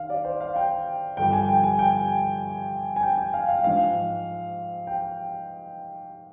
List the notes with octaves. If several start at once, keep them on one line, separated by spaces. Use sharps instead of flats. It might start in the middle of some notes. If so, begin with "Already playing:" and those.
Already playing: D#3 F5
D5
C5
F5
G5
G2 D3 F3 G5
G#5
G5
G#5
G5
G#5
G5
G5
F5
F5
G#2 F3 F5
G5